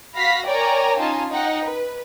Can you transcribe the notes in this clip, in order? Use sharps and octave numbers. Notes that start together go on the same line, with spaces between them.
F#4 F5 B5 A#6 B6
A#4 C#5 D5 G5 G#5 A#5
C#4 D#4 F4 G#5 A5
D#4 F#5 G5
B4